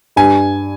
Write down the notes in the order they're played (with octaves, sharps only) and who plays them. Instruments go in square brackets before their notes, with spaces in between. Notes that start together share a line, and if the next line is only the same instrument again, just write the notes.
[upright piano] G2 [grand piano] G#5